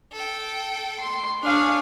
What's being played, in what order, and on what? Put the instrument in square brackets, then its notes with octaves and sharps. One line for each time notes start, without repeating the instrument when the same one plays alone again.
[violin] A4 G5
[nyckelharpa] C6
[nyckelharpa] D4 F5 [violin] G#4 C#5